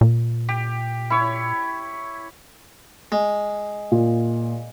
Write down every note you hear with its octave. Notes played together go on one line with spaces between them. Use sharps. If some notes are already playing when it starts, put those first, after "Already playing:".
A#2
G4
E4 C#5
G#3
A#2